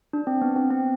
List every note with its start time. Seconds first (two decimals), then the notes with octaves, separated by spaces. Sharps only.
0.13 D4
0.27 C4
0.42 B3
0.56 C4
0.70 C4